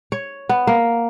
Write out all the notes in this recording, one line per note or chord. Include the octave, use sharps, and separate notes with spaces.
C#5
B3
A#3